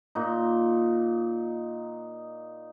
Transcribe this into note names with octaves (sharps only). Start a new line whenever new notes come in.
A#2 D#4